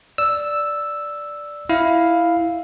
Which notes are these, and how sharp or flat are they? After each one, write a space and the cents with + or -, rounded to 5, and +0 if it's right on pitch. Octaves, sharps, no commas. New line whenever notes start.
D5 +0 E6 +0
E4 +0 F5 +0